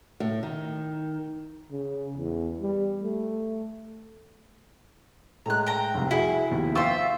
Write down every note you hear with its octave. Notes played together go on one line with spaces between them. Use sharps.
A2
D#3
C#3
E2
G3
A3
A2 G#3 A#5 F#6
G5 A#5
F1 C2
E4 F#4 G#4
F1 D#2 B3
F4 C5 E5 G5 C#6 E6